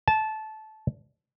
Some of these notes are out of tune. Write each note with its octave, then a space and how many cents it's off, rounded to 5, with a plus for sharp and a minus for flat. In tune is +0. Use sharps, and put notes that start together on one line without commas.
A5 -20